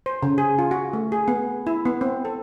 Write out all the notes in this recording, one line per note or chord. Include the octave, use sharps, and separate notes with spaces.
C5
C#3
G#4
F4
F#4
A3
G#4
B3
E4
B3
C4
A4